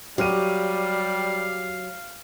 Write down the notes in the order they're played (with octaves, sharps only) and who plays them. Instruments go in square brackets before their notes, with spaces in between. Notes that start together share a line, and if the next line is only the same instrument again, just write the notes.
[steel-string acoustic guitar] F#3 [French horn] G3 [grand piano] G4 F6 D#7 [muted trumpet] F5